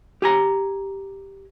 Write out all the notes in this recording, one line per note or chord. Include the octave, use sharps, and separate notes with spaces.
G4 G#5 A#5